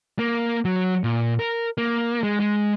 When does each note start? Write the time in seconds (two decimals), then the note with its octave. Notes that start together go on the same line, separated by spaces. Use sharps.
0.19 A#3
0.65 F#3
1.04 A#2
1.39 A#4
1.78 A#3
2.23 G#3
2.40 G#3